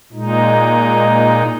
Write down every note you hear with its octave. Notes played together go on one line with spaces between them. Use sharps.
A#2 G#3 D#4